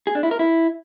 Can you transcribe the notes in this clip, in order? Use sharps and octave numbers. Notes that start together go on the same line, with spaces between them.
G#4
D4
E4
A#4
E4